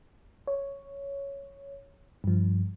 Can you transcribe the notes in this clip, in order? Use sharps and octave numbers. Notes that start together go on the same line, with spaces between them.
C#5
G2 F3